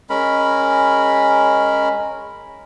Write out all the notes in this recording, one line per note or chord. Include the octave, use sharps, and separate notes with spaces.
G#3 C#4 A#4 B5